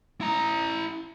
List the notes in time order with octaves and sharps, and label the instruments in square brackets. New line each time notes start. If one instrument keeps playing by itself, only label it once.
[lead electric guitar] E4 A#5